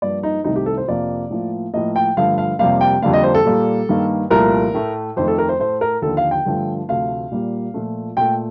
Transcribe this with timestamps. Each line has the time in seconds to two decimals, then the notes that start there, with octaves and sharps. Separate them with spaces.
0.02 G2 F3 A#3 D5
0.23 D#4
0.44 C2 C3 D#3 A3 D#4
0.56 G4
0.66 A4
0.77 C5
0.88 F2 C3 F3 A#3 D5
1.30 A2 F3 A#3
1.73 A2 F3 A#3 D#5
1.96 G5
2.17 G2 D3 F3 A3 F5
2.38 F5
2.59 F2 C3 G3 A#3 F5
2.81 G5
3.02 F2 D3 G3 A#3 F5
3.13 D#5
3.24 C5
3.35 A4
3.45 A#2 G3 A#3
3.89 G2 D#3 A#3
4.31 C2 A#2 F3 A3 A#4
4.74 A2 A3
5.16 F2 D#3 A3 C5
5.28 A4
5.38 A#4
5.49 C5
5.59 A2 A3 C5
5.81 A#4
6.02 D#2 D3 F3 A#3 A4
6.17 F5
6.31 G5
6.45 G2 D3 F3 A3
6.88 D2 C3 F3 A3 F5
7.31 A#2 G3 A#3
7.74 A#2 F3 A3
8.17 A#2 A3 G5